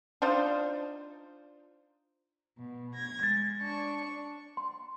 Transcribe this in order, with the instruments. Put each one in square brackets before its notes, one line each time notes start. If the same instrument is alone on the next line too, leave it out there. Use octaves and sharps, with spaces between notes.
[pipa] D4 D#4 F4 C5
[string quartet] B2
G#6 A#6
[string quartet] G#3 [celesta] A6
[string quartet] D4 C#6
[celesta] C6